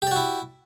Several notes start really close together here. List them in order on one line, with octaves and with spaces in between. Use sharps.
G4 D5 F#4 E4